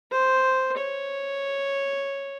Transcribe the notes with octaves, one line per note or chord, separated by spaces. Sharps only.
C5
C#5